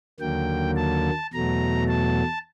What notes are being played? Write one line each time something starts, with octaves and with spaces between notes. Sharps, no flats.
D#2 D3 F#3 A#3 G5
A5
E2 B2 F#3 A3 A#5
A5